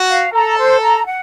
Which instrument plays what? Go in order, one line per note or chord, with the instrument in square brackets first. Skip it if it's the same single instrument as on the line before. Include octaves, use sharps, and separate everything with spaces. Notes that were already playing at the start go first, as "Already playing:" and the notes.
Already playing: [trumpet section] F#4
[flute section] F5
[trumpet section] A4 [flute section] A#5
[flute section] C5
A#5
F#5